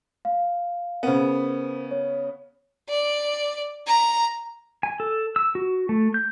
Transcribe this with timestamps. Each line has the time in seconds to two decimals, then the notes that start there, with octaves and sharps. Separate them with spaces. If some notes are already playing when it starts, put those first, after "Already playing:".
0.25 F5
1.03 C#3 B3 A#4 C5
1.91 C#5
2.89 D5
3.87 A#5
4.83 G#5
5.00 A4
5.36 E6
5.55 F#4
5.89 A3
6.14 G6